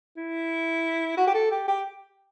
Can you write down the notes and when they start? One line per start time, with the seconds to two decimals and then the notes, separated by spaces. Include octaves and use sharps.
0.17 E4
1.18 F#4
1.27 G4
1.35 A4
1.51 G4
1.68 G4